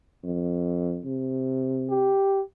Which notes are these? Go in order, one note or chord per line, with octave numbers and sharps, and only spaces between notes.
F2
C3
G4